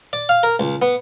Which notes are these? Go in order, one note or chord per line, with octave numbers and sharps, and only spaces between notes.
D5
F5
A#4
C#2
B3